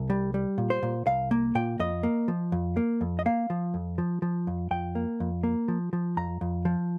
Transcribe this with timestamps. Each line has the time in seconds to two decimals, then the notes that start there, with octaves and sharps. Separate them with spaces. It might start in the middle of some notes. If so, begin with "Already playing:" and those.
Already playing: C2
0.10 G3
0.34 G3
0.58 A#2
0.70 C5
0.83 A#2
1.06 C2 F5
1.31 A#3
1.55 A#2 G5
1.79 F2 D#5
2.03 A#3
2.28 F3
2.52 F2
2.77 A#3
3.01 F2
3.19 D#5
3.26 A#3 F5
3.50 F3
3.74 F2
3.98 F3
4.22 F3
4.47 F2
4.71 F2 G5
4.95 A#3
5.20 F2
5.43 A#3
5.68 F3
5.93 F3
6.17 F2 A#5
6.41 F2
6.65 F3